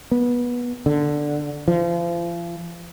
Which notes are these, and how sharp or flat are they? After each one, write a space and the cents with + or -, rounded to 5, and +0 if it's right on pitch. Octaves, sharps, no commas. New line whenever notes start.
B3 -20
D3 +5
F3 -35